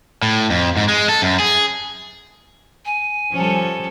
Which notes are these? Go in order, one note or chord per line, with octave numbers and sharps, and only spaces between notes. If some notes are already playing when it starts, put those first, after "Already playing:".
A2
F2
G#2
G#3
A4
F#2
G#4
G#5
F3 G3 C#4 A4